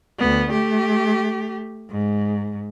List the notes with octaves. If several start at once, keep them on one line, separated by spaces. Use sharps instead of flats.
D2 B3
A3 G4
G#2